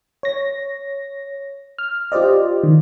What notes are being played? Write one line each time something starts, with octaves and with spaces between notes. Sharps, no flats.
C#5 A#6
F6
F4 G4 C5 D5 D#5
D#3